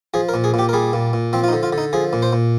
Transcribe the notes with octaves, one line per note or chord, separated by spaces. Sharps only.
F3 G#4
A#4
A#2
G#4
A#2 G4
A#4
G3 G#4
A#2
A#2
F3 C4
F4
D#4
D3
F4
D3
D#4
F3 G#4
A#2
C5
A#2